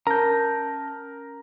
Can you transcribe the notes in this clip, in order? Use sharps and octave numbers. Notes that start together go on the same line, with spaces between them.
C#4 A#4 A5 A#5 G6 A#6